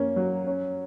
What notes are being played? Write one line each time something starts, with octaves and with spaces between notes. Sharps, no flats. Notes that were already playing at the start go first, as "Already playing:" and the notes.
Already playing: A#3 C#4
F#3
C#4